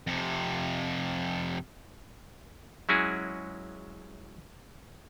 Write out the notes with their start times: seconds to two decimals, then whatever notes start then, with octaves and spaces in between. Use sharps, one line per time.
0.07 F2 C3
2.89 F#3 G#3 C#4 E4 F#4 G#4